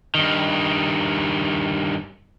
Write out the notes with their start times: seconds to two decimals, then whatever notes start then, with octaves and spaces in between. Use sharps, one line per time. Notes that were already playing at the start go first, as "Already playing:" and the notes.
0.15 G2 D#3